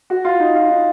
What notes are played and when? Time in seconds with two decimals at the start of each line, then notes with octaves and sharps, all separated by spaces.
0.10 F#4
0.25 F4
0.40 D#4
0.55 F4
0.71 D#4